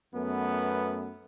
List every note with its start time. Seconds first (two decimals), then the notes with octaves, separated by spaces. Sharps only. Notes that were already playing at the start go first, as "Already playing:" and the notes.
0.15 F#2 A3 B3